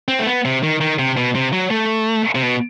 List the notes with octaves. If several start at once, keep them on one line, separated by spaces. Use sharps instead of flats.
C4
A3
B3
C3
D#3
D#3
C3
B2
C3
F#3
A3
C3
B2